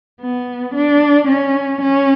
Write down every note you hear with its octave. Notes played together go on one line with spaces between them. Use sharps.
B3
D4
C#4
C#4